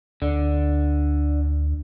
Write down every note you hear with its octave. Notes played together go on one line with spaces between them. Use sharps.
D2 D3